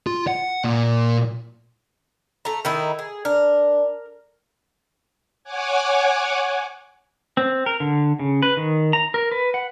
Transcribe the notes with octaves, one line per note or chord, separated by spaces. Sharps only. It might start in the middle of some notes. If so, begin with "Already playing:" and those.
F4
F#5
A#2
A3 A#5
D#3 D#4 E4
G#4
D4 A#4
C#5 F#5 G#5 D6
C4
A#4
D3
C#3
B4
D#3
A#5
A#4
B4
F#5